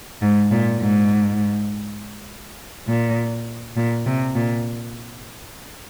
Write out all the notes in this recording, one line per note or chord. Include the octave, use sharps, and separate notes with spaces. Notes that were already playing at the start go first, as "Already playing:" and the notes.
G#2
A#2
G#2
A#2
A#2
C3
A#2